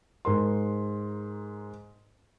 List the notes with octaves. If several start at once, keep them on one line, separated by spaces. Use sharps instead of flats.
G#2 A#4 C6